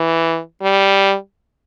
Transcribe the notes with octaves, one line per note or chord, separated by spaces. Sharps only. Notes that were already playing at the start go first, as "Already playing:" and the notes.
Already playing: E3
G3